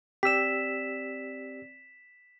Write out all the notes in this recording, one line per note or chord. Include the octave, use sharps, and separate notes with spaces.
C4 G4 D5 E6 B6 E7